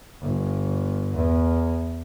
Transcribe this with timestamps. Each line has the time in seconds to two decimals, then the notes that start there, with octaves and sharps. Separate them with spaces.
0.21 G1
1.14 E2